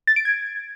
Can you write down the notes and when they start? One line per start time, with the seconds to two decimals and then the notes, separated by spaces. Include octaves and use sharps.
0.07 A6
0.16 D7
0.25 G#6